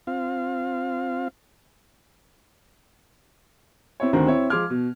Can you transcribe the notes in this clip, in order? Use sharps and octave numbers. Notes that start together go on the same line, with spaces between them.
C4 F4 F5
C4 E4 C#5
D2 D3 D#3 C4 C5 A#5
C4 E4 C#5
F3 G#3 C6 D6 F6 G#6
B2